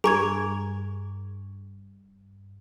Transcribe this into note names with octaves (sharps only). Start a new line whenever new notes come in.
G2 G#4 A#4 G#5 A#5 C#6 G#6